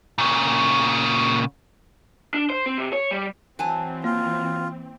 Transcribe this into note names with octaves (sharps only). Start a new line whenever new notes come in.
A#2 C#3
D4
C5
C4
C3
C#5
G3
E3 F#3 C4 G#5 A5
A#3 F4